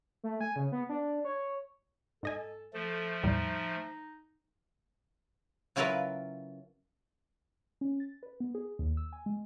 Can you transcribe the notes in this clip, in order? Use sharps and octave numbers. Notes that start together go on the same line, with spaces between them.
A3
G#5
C#3
B3
D4
C#5
G#2 A4 D#5 G#5
F3 A3 A4
E2 A2 G3 D#4
C#3 F#3 E4 F4 A#4 B4
C#4
A6
B4
B3
G#4
D#2
E6
G#5
G#3